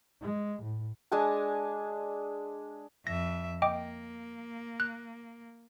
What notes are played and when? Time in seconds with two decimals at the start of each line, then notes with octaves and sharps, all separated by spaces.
0.22 G#3
0.63 A2
1.12 G#3 D4 G#5 A5
3.07 F2 E5 A#6
3.62 A#3 D#5 G5 D6
4.80 F#6